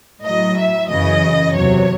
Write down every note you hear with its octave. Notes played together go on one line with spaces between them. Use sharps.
A2 F#3 D#5
E5
F#2 C#3 E3 D#5
E2 C3 F#3 C#5